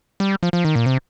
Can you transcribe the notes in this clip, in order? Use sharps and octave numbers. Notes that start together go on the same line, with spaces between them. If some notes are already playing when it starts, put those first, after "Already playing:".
G3
F3
F3
D#3
A#2
C3